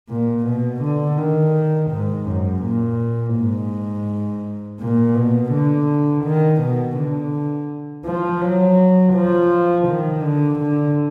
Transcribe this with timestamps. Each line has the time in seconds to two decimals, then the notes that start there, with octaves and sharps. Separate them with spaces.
0.09 A#2
0.46 B2
0.82 D3
1.18 D#3
1.90 G#2
2.26 F#2
2.62 A#2
3.35 G#2
4.80 A#2
5.15 B2
5.52 D3
6.25 D#3
6.61 B2
6.97 D3
8.05 F3
8.41 F#3
9.14 F3
9.87 D#3
10.22 D3
10.59 D3